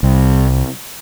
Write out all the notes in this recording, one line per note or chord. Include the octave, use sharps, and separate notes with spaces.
C2